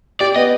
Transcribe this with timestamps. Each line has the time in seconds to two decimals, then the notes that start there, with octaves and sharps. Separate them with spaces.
0.20 G4 D5
0.36 B3 D#5